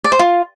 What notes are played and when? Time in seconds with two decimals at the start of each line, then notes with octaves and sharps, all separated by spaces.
0.04 D5
0.12 C5
0.19 F4